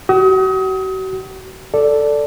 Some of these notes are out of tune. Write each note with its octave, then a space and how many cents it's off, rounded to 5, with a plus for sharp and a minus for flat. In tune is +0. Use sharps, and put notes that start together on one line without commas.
F#4 +40 D#6 +35
A4 +5 D5 -5